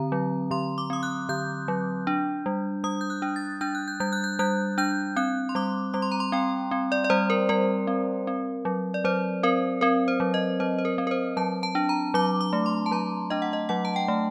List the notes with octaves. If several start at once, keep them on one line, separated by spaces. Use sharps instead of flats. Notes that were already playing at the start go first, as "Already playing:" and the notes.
Already playing: D3 C4 A#5
F#3
D3 C6
D6
C4 D#6
F#6
D3 G6
F#3
D4
G3
G3 D#6
G6
F#6
D4
A6
D4 G6
F#6
G6
G3 G6
F#6
G6
G3 F#6
D4 G6
C4 F#6
C6
G3 D6
G3 D6
C6
A#5
C6
C4 G5
C4
D5
D5
G3 C5
A#4
G3 A#4
C4
C4
F#3
D5
F#3 C5
C4 A#4
C4 A#4
C5
F#3
D#5
F#3 C5
C5
A#4
C4
A#4
C5
F#3 A5
A5
D4
A#5
F#3 D6
D6
A3
C6
A5
F#3 A#5
D4 D#5
F#5
D#5
F#3 F#5
A5
G5
A3